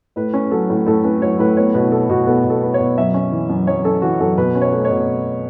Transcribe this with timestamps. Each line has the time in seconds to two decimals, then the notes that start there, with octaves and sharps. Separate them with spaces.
0.16 A2 B4
0.34 C#4
0.51 F#3 A4
0.70 A2
0.86 A2 A4
1.04 C#4 B4
1.22 F#3 C#5
1.39 A2 B4
1.57 B3 C#5
1.74 B2 B4
1.92 B3 A4
2.10 B2 F#4
2.27 B3 A4
2.44 B2
2.50 A4
2.63 B3
2.74 C#5
2.80 B2
2.98 F#2 E5
3.14 C#4
3.32 E3
3.50 F#2
3.67 F#2 C#5
3.85 C#4 A4
4.02 E3 F#4
4.20 F#2 A4
4.37 B2 B4
4.55 C#4
4.61 C#5
4.72 A3
4.85 C#5
4.90 B2